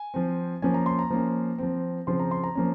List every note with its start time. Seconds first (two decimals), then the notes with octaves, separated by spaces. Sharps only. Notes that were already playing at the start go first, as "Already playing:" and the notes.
Already playing: G#5
0.14 F3 C4
0.62 F3 A#3 C#4 G#5
0.74 A#5
0.86 C6
0.99 A#5
1.10 F3 A#3 C#4
1.58 F3 C4
2.07 C#3 F3 C4 C6
2.20 A#5
2.31 C6
2.44 A#5
2.55 F3 A#3 C#4